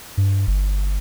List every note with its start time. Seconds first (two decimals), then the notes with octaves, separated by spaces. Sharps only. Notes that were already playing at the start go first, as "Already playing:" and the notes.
0.17 G2
0.47 G1